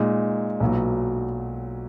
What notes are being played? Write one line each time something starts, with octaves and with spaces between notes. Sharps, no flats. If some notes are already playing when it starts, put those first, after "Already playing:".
Already playing: A#2 G#3 D#4
B1 A#2 F#3 B3